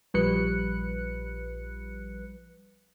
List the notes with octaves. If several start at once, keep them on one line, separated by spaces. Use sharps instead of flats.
A#1 F3 G3 B4 F#6 C#7